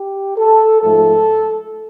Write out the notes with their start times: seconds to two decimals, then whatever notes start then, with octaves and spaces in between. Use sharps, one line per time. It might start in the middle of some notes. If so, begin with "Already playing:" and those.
Already playing: G4
0.37 A4
0.81 G#2 F3 A3 A4